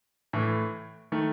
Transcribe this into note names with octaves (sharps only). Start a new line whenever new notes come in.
A2 E3 A3
D#3 A3